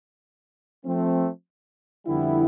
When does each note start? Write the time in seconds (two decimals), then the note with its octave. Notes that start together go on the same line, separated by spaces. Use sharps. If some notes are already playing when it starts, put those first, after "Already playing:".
0.85 F3 A3 C4
2.06 F2 D3 G3 B3 E4